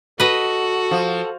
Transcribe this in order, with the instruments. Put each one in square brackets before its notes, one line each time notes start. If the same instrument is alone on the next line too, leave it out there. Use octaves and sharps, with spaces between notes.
[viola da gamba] F#4 [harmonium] A4 [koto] B4 D#5
[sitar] F3